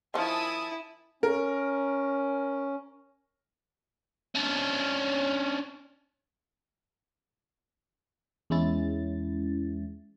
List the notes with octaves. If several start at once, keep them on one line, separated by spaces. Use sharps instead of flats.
D#3 F3 E4 G#5 A5 D#6
C#4 A#4
C#4 D4
E2 G#3 C#4 E4 A6